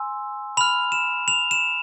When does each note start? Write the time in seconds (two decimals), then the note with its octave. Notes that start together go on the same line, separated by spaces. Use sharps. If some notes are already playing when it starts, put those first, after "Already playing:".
Already playing: G#5 C6 E6
0.57 B5 F6 F7
0.92 E7
1.28 F7
1.51 E7